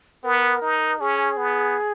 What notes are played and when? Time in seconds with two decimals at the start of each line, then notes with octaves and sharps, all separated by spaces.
0.24 B3 A#4
0.62 D#4
0.99 C#4 G#4
1.37 B3